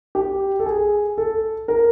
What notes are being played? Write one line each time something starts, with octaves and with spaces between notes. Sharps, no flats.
G4
A4
G#4
A4
A#4